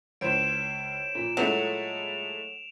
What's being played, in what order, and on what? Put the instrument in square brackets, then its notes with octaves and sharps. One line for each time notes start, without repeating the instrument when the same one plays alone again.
[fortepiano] C#2 [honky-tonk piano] E4 C5 C#5 [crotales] D7 E7
[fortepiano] A#2
[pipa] F#3 [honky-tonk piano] G#3 A3 E4 [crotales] F7